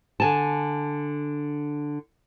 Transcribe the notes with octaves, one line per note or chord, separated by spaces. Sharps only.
D3 G#5 A5